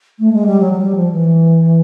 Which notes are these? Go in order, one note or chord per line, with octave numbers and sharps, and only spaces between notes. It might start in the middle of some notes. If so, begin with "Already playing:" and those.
A3
G#3
G3
F#3
F#3
G3
F3
E3